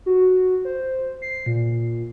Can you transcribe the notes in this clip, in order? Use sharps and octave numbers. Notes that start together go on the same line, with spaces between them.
F#4
C5
C7
A#2